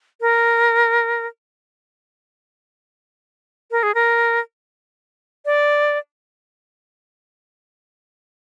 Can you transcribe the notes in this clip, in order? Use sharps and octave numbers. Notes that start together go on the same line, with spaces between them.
A#4
A#4
G#4
A#4
D5